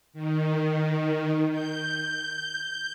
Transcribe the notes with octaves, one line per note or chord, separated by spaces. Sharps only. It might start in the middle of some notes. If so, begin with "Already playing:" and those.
D#3
G6